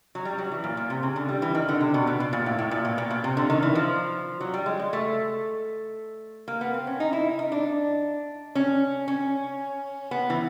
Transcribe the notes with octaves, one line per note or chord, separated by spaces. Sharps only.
F#3
G3
F#3
E3
A#2
A#2
C3
C#3
D3
G3
E3
D#3
D3
C3
B2
B2
B2
A#2
A2
A2
A#2
B2
A#2
B2
C3
D3
D#3
E3
F3
F#3
G3
G#3
G#3
A3
A#3
B3
C4
C#4
D#4
E4
D#4
D4
C#4
C#4
B3
E3